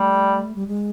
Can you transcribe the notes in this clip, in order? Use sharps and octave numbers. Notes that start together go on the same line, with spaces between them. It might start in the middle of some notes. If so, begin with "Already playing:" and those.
Already playing: G3 A3
G3
G#3